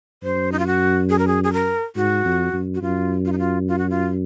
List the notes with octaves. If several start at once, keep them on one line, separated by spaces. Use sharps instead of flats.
F#2 C5
D#4
F4
F#4
G#4
A#4
G#4
G#4
A#4
G#2 F#4
F2
F#2
F#4
F#2 F4
F4
D#4
F4
F4
F#4
F4